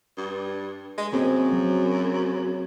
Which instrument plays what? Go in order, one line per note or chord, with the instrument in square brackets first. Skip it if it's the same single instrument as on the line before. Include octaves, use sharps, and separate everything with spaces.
[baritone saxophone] G2
G#3
[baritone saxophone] F#2 [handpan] A#3 C4 G#4
[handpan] F#3